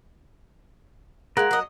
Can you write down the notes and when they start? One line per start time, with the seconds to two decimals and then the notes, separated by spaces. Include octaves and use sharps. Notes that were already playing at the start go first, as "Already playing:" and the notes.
1.37 G#3 A#3 A#4 F#5
1.51 F#3 D#5